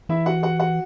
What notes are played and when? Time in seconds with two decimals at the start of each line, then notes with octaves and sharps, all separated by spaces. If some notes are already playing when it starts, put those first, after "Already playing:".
0.09 E3 E4 E5
0.26 F#4 F#5
0.43 F#4 F#5
0.60 F#4 F#5